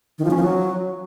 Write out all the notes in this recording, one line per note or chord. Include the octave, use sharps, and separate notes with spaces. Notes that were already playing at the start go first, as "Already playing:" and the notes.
D#3
F3
C#4
F3
F#3